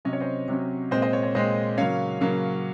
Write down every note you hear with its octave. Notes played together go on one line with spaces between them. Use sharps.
C3 F#3 C#4 D#5
C#5
C5 D#5
C3 F#3 C#4
A#2 G#3 C4 C5 D#5
C5 D#5
C#5
C#5
A#2 G#3 C4 C5 D#5
C#3 F#3 A#3 C#4 C#5 F5
C#3 F#3 A#3 C#4